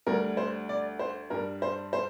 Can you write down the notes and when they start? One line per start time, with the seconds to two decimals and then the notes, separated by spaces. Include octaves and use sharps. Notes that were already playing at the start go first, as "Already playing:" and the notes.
0.06 D2 D3 G3 A#4
0.37 C5
0.69 D5
0.99 C5
1.30 G2 G3 A#4
1.62 C5
1.93 C5